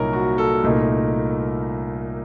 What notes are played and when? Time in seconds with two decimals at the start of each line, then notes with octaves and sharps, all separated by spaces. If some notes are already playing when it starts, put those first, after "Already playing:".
Already playing: C2 A#2 F#3 A#3 D#4 A#4 C#5
0.13 F#4
0.38 A4
0.63 C2 A#2 A3 D#4 A#4